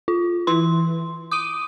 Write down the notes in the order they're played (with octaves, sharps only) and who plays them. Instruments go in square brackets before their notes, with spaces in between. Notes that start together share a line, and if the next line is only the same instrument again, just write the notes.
[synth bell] F4
[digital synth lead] E3 [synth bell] C6
[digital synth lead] D6 [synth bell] D#6 D#7